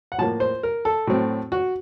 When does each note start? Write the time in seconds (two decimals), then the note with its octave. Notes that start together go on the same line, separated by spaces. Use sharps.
0.12 F#5
0.18 A2 F3 A#3 A5
0.40 C5
0.63 A#4
0.85 A4
1.07 A2 F#3 A3 C4
1.52 F#4